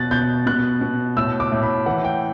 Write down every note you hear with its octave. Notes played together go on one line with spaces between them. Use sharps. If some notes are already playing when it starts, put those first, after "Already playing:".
Already playing: B2 F#6 A6
B2 G6
B2 F#6
B2
A2 E6
D6
A2
B5
E3 F#5
G5